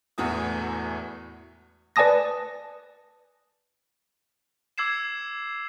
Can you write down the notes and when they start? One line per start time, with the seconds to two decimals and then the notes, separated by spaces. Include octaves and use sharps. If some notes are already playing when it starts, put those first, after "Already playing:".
0.18 E1 E2 A2 E3 F#4 D#6
1.96 B4 D5 G#5 A5 D#6 A#6
4.78 D6 E6 G#6 C7 E7